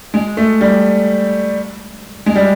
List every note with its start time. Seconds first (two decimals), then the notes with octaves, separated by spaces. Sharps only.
0.14 G#3
0.37 A3
0.61 G3
2.26 G#3
2.35 G3